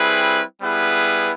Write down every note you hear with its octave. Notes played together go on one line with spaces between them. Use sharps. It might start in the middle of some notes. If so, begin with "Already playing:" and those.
Already playing: G3 C4 E4 G#4 B4
G3 B3 E4 G#4 B4